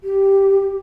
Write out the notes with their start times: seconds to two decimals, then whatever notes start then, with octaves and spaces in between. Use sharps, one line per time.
0.04 G4